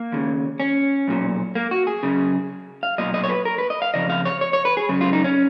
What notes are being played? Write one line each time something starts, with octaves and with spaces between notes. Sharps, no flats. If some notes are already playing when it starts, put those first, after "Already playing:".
Already playing: A#3
D#2 C#3
C#4
B1 A#2
A#3
F#4
G#4
F#2 C#3
F5
B1 A#2 D#5
D#5
C#5
B4
A#4
B4
D#5
F5
F2 C#3 D#5
F5
C#5
C#5
C#5
B4
G#4
F#2 C#3
F4
D#4
C#4